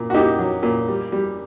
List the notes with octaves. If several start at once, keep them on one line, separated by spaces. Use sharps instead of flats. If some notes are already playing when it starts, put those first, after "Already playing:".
Already playing: A#2
F#4
A#2 D#4 G4
F#3
A#2
G3
G3